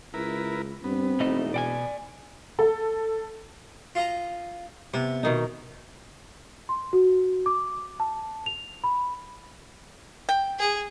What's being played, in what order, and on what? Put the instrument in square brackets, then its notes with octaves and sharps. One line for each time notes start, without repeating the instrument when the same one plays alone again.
[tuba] C#2 [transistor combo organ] E4 A#4 B4
[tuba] G2 [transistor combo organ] B3 [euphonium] C4
[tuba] E1 [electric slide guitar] A3 D#4 D#5
[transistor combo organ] B2 [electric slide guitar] D5 G5 G#5
[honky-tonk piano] A4
[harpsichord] F4 D#5 A#5
[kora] C3 [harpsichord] B3
[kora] B2 D#3 D#4
[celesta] C6
F#4
D6
A5
F7
B5
[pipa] G5
[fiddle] G#4